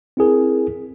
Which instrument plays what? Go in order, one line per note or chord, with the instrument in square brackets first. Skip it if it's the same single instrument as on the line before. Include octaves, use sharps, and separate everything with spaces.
[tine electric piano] C4 E4 G#4 A#4